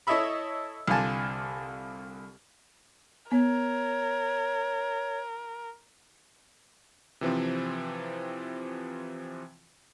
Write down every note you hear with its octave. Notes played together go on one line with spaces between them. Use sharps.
E4 A4 C#5 D#5 E5 B5
C2 D3 F4 G#5 A5
B3 A#4 C#5
C3 E3 F3 C4